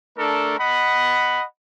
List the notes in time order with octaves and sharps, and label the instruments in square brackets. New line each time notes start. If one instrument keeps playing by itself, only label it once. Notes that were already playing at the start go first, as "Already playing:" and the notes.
[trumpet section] A3 D4 A4 A#4
D#5 F#5 B5